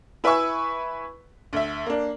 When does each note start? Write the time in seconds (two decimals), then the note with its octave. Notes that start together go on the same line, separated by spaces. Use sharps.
0.24 E4 B4 E5 G#5 C#6 E6
1.53 D2 E5
1.86 A#3 D4